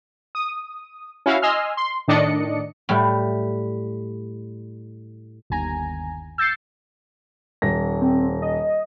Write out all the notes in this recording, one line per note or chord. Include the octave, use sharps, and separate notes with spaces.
D#6
C#4 E4 F#4 F5
D#5 G#5 C6 E6 F6
C6
A2 D#3 D4 D5 D#5 C#7
A2 G3
G1 D#2 G#5 A#5
E6 G6 A6 C7 C#7
D#1 A#6
C4
D#5